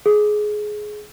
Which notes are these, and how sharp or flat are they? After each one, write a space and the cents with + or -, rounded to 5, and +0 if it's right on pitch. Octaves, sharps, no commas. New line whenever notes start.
G#4 +15